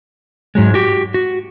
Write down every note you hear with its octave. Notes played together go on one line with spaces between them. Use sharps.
G#2 F#3 G#3
F#4 G4
F#4